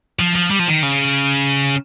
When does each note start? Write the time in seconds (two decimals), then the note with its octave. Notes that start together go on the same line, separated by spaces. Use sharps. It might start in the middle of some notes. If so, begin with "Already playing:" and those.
0.19 F3
0.35 F3
0.51 G3
0.59 F3
0.68 D#3
0.83 C#3